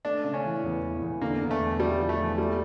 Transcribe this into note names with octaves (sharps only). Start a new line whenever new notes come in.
A3 D4
C#3
C#4
E3
E2
E3
E2
D3 A#3
E2
A3
E2
E2 G3
F3
A3
E2
G3 A3